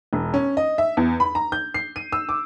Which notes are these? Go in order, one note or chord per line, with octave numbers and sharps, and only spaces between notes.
E1
C#4
D#5
E5
E2
B5
A#5
G6
C7
D#7
E6
D6